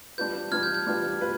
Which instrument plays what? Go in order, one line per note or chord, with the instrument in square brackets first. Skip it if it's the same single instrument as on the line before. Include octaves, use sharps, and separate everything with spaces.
[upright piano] G3 D4 F4 B4 [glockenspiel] G6
[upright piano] G3 D4 F4 B4 [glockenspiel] F6 G#6
[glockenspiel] G6
G6
[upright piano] G3 D4 F4 B4
F4 B4